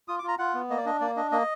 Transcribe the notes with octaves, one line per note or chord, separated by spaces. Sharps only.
F4 D#6
D6
F4 A#5
F4 F#5
B3
A#3 D#5
D5
D4 D#5
A#3 D5
D4 D#5
A#3 D#5